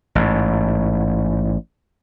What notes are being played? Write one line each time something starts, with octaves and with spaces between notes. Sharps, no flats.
A1 G#2